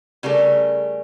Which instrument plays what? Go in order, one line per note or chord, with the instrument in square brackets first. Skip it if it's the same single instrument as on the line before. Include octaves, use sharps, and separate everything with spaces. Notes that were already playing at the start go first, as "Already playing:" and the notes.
[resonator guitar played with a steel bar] C#3 G3 A3 A#4